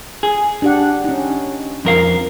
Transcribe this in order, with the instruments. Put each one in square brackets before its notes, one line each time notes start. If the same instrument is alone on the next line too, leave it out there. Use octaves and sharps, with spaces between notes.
[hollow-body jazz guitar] G#4
[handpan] D4 G4 F#5
C#4 D#4
[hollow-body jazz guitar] F2 A#4 F5